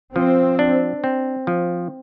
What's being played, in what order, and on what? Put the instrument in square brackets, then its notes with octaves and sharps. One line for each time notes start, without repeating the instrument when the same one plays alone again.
[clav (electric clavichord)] F3 [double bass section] C4
[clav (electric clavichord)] D4
C4
F3